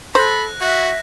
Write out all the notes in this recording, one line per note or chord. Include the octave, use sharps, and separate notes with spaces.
A4 C5 B5 F#6 A#6
F#4 E5